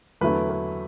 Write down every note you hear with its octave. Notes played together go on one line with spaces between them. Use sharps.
E2 D3 F#3 A3 E4 B4
B4